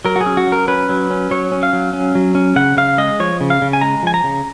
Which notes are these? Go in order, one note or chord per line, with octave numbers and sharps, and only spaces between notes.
F#3 A#4
F#4
G#4
C#4
F#4
F#3
A#4
C#4 B4
F#3
C#4
F#3 C#5
C#4
F5
F#3
C#4
F#3
C#4
C#3 F#5
C#3 F5
G#3 D#5
F3 C#5
C#3
F5
C#3
G#5
G#3 A#5
F3 G#5
A#5
C#3